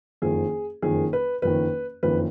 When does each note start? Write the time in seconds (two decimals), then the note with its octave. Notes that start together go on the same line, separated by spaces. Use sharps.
0.22 F#1 F2 D#3 G#4
0.82 F#1 F2 D#3 G#4
1.13 B4
1.42 F#1 F2 D#3 B4
2.03 F#1 F2 D#3 B4